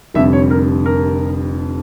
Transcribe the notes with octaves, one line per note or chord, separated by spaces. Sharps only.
F1 F2 D3 G3 E5
C#5
A#4
A#4